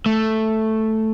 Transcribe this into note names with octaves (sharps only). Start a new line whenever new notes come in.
A3